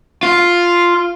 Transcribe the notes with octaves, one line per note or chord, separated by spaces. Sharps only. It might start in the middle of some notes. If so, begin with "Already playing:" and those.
F4